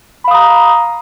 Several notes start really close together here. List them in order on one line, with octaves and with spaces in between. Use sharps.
B5 F5 D#6 A#5